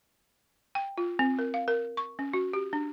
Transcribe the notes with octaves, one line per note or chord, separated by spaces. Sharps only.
G5
F4
C4
A#4
F5
A#4
C#6
C#4
F#4
G4
D4